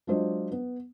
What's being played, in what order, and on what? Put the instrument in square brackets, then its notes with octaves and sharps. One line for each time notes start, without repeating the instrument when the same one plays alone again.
[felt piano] F#3 G#3 D4 F4 C5 D#5
B3